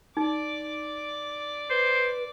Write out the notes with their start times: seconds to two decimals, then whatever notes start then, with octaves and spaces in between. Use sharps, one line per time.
0.17 D#4 D5 D6
1.70 B4 C5